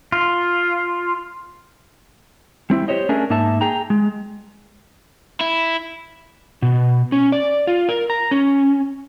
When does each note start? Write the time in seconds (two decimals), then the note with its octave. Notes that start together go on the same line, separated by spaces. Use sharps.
0.12 F4
2.70 G3 C4 E4
2.88 G4 C5 C#5 D#5
3.09 A3 C#4 D4 G#4 A#4 E5
3.30 G#2 A#3 D#4 E5 A5
3.61 G#4 G5 A#5
3.90 G#3
5.41 E4
6.62 B2
7.12 C#4
7.32 D5
7.67 F4
7.89 A#4
8.10 A#5
8.31 C#4